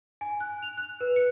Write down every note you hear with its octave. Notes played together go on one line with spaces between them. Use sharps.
G#5
F#6
F7
F#6
B4
C#7